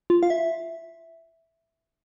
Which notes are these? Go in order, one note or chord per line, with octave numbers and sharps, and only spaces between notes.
F4
F5
E5